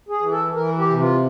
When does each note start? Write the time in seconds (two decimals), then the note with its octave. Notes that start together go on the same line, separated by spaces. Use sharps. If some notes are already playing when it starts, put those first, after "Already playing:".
0.09 G#4
0.20 E3
0.32 A4
0.54 E3 A#4
0.78 G4
0.89 C3
1.00 F4